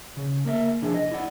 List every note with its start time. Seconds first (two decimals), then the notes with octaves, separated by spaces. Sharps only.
0.17 C#3
0.45 A#3 A#4 D#5 E5
0.82 C3 F3 D4 E4 G#4
0.94 D#5
1.12 E4 D5 F#5